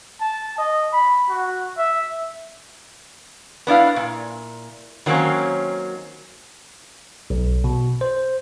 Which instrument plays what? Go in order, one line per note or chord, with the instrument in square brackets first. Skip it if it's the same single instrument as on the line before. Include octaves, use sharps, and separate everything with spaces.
[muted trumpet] A5
D#5
B5
F#4
E5
[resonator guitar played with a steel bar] B3 D4 E4 F5
A#2
D#3 F#3 A#3 C4 C#4
[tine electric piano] B1
B2
C5